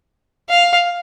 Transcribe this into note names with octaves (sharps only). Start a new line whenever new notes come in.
F5